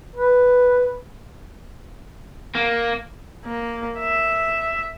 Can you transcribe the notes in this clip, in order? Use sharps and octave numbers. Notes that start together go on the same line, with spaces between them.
B4
A#3
A#3
E5